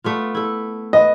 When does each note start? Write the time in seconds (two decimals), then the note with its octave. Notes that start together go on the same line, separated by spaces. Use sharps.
0.04 A3 B3 F4
0.35 E4 A4
0.93 B4 D#5